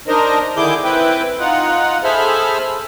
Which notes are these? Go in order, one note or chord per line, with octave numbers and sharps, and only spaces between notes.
D4 D#4 A#4 C5 D#5
D3 D#3 E4 G#4 D6 G6
C4 E4 B4 G5
D#4 F4 F#5
G#4 A4 C5 E5 B5 F6